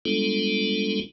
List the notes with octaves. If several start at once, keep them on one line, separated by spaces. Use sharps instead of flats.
G3 G#3 B3 D4 F4 A4